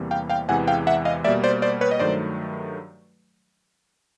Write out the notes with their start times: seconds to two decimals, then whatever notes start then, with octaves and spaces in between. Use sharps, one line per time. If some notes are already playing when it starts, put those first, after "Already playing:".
Already playing: E2 C3 E3 G3 A#3
0.11 F5 G5
0.30 F5 G5
0.49 E2 C3 E3 G#3 F#5 G#5
0.67 F5 G5
0.87 E5 F#5
1.05 D#5 F5
1.24 B2 G3 A#3 D5 E5
1.44 C5 D5
1.62 C5 D5
1.81 B4 C#5
1.91 D#5
2.00 G2 D#3 F#3 A3 C5 D5